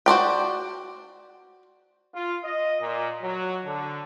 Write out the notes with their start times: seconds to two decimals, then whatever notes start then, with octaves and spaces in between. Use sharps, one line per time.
0.06 F#4 C5 D5 G5
2.15 F4
2.44 D#5
2.81 A#2
3.21 F#3
3.65 D3